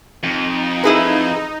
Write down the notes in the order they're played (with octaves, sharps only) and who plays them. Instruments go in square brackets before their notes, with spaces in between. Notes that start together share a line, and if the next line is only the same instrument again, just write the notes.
[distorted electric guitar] F2 [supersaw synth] D#4
[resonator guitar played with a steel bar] E4 G#4 B4